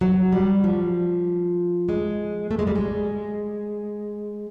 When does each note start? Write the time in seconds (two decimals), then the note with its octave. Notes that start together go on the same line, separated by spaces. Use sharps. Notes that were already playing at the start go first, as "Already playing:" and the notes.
0.01 F#3
0.33 G3
0.64 F3
1.89 G#3
2.51 A3
2.59 G#3
2.67 G3
2.76 G#3